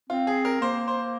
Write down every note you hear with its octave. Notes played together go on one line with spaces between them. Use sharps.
C4 F4
G#4
A#4
A#3 C5
C5